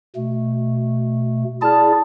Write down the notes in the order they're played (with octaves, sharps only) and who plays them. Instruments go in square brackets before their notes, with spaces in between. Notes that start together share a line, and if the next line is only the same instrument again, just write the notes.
[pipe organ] B2 A3
[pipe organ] E4 G#4 D5 [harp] A5 F6